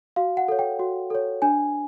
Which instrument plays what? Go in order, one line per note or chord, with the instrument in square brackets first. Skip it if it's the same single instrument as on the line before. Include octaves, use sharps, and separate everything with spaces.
[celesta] F#4 F5
F#5
A4 C#5
G5
F#4
A4 C#5
D4 G#5